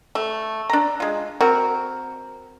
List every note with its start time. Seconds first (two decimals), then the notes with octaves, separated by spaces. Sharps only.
0.15 A3
0.70 D4 A#5
1.00 G#3 F4
1.41 C4 F#4 A#4